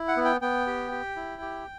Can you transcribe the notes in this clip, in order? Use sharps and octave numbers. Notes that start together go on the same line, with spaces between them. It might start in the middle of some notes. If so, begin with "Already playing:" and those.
Already playing: E4
F#5
B3
G5
B3 G5
G4
G4
E4
G4